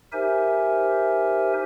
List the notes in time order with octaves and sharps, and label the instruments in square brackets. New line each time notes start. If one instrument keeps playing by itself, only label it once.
[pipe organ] D#4 G4 A#4 C5 E5 G#5